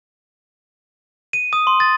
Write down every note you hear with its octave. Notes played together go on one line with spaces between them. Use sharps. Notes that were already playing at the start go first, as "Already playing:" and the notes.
D#7
D#6
C6
A6